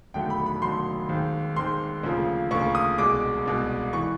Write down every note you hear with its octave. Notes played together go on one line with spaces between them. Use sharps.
E1 D#2 D3 F#3 A3 G5
B5
B5
E1 D#2 D3 F#3 A3 C6
D#2 D#3 G#3 C4
D#2 D#3 G#3 C4 C6
D2 C#3 F3 A#3
D2 C#3 F3 A#3 C#6
D#6
C2 B2 G#3 D6
C2 B2 G#3
E3 C#6